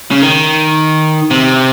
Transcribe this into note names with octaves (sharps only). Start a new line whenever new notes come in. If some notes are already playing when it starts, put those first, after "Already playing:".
C#3
D#3
C3